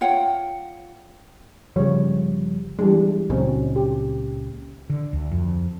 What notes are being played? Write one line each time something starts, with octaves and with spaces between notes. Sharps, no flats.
F4 C#5 F#5 G5
G1 C#3 F3 G3 C#5
E3 G3 G#3 D4
C#2 A#2 C#3 F#3 C4 D#4
G4
D3
D2
F2